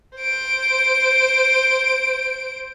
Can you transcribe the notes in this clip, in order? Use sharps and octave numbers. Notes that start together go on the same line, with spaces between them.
C5 D7